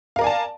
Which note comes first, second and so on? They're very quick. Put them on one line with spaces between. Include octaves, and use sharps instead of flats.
F5 A#4 D5 G#5 A5